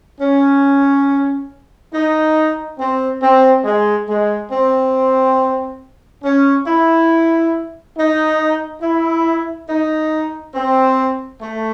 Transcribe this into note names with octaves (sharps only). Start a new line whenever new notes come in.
C#4
D#4
C4
C4
G#3
G#3
C4
C#4
E4
D#4
E4
D#4
C4
A3